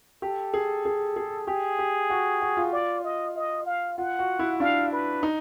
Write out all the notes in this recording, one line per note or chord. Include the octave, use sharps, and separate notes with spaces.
G4 A4
G#4
G#4
G#4
G4 G#4
G4
F#4
F#4
F4
D5
D#5
D#5
F5
F4 F#5
F#4
E4
D4 F5
B4
D#4